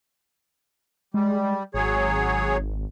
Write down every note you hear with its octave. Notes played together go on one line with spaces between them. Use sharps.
G3 G#3
G#1 F#3 G#4 C#5